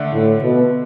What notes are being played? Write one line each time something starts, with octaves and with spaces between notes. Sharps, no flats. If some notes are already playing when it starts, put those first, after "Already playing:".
Already playing: D3 A3 D4
A2
B2